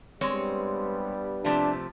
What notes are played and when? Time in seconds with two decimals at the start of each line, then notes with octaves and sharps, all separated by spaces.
0.21 G2 G3 G#3 B3 C4 C#5
1.45 C3 F3 A3 D4